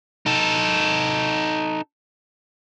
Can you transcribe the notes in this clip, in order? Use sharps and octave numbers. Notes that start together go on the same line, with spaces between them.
D#4 A4